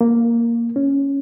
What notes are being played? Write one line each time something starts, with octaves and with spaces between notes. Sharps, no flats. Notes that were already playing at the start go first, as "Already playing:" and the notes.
A#3
C#4